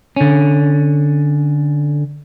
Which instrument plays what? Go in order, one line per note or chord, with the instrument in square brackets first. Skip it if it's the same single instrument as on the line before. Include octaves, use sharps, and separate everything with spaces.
[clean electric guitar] D3 C#4